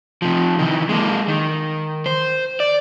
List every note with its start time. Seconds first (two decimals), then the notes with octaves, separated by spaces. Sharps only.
0.22 C3 F3
0.59 D#3 E3
0.89 G#3 A#3
1.28 D#3
2.06 C5
2.60 D5